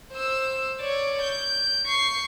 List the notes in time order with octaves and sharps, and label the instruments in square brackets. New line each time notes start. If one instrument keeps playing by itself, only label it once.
[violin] C5 E6
C#5 D5
G6
C#6 C7